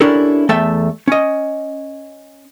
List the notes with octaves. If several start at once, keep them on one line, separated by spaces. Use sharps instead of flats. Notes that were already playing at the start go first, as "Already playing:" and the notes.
C#4 D4 E4 G4 A4 A#4
E2 A3 A4 E5 G5 A5
C#4 D#5